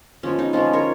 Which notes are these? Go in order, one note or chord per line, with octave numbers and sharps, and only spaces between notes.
F3 G#3 B3 C#4
D#4
F3 G#3 B3 C#4 F4
A#4 C#5